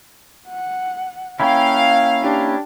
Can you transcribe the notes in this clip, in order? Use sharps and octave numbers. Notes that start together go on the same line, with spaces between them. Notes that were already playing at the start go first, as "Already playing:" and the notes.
F#5
A#3 C#4 E4 F5 G5
D4 G4